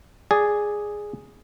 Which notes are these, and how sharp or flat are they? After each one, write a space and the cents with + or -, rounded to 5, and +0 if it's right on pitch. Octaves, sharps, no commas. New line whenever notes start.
G#4 +0 D5 +0